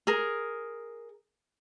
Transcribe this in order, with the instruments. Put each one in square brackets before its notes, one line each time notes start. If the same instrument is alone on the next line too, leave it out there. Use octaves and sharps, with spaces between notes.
[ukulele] G#4 A#4